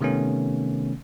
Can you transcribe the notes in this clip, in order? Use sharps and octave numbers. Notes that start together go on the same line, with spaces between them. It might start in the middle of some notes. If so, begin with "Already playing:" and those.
C3 D#3 A3 B3 C#4